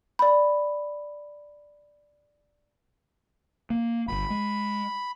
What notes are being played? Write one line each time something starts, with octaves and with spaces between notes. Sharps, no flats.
D5 B5
A#3
D1 G1 B5
G#3